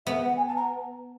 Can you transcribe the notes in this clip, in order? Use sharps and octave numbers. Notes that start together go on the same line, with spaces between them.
B3 E5
F#5
G#5
A5
A#5